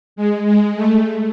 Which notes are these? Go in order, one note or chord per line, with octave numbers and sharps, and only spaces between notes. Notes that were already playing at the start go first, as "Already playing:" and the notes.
G#3
G#3
A3